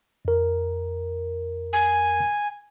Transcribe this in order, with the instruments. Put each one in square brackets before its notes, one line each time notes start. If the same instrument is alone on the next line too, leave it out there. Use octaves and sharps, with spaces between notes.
[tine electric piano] F2 A#4
[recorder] G#5